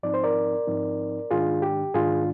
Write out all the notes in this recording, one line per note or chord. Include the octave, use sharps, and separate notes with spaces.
G#2 F3 C4 D#4 D5
C5
A#4 D5
G#2 F3 C4 D#4
G#2 D#3 G#3 D4 F4 G#4
G4
G#2 D#3 G#3 D4 F4 G#4